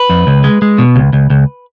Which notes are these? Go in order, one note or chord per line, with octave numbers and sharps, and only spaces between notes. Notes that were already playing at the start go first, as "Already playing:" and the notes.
Already playing: B4
F2
C#2
G#3
G#3
B2
C#2
C#2
C#2